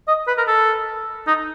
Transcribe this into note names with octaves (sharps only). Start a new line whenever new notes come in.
D#5
B4
A#4
A4
D#4